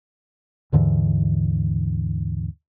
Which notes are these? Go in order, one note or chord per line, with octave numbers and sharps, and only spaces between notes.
D#2 G#2 D3 E3